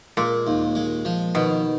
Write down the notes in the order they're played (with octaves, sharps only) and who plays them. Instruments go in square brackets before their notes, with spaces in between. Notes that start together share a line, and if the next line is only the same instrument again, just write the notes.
[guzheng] A#2 [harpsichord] G#3
[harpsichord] D#2
G#3
F3
[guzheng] B2 [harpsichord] D#3